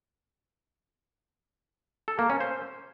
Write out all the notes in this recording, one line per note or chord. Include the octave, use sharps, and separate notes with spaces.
A4
A#3
C#4
C5